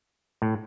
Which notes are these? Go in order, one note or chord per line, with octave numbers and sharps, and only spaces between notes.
A2